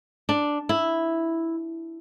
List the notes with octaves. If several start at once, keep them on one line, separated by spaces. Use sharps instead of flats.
D4
E4